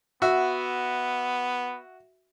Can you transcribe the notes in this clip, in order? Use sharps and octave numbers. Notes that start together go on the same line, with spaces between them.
B3 F#4 E5